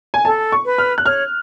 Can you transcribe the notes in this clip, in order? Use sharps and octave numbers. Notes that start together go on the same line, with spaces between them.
G#5
A4 A5
C#6
B4
F6
F#6
C#5 F6